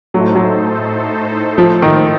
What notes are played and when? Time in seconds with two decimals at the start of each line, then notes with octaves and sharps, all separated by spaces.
0.14 A2 F#3 A3 D#4 A4 C5
0.35 F#3
1.58 F3
1.82 D#3